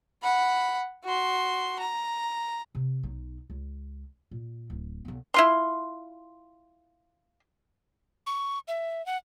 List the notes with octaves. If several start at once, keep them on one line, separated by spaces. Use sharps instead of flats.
F#5 B5
F#4 C6
A#5
C3
B1 D#4
C#2
A#2
D1
B1 B3
E4 F4 C6
C#6
E5
F#5